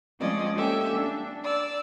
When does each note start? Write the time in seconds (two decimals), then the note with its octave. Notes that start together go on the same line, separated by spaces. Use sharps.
0.19 F3 G#3 C4 C#4 D5 D#5
0.55 A#3 C#4 G4 A4 E5 G#5
0.93 D4
1.43 D5 E6